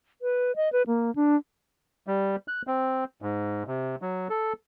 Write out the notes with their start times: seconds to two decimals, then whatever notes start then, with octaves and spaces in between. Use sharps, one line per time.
0.22 B4
0.56 D#5
0.73 B4
0.87 A#3
1.16 D4
2.07 G3
2.48 F#6
2.67 C4
3.22 G#2
3.67 C3
4.02 F#3
4.30 A4